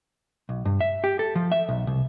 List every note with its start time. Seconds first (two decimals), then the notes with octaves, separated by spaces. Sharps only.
0.49 B1
0.65 G2
0.81 E5
1.04 G4
1.19 A4
1.35 F3
1.52 E5
1.69 B1
1.87 C2